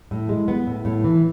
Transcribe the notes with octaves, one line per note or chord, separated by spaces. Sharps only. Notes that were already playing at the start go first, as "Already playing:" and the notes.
A2
G#3
B3
A2
A2
E3